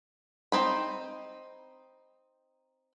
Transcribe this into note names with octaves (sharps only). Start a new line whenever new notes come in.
C4 D#4 B5